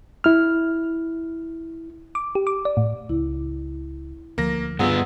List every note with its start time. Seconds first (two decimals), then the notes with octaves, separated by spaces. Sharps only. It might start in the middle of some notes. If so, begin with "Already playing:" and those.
0.24 E4 F6
2.15 D6
2.35 G4
2.47 D6
2.65 D5
2.77 A2
3.09 C#2 E4
4.38 D2 F3 A#3 A#6
4.79 G2 B3 F4 G#4 F#5 A#5 E6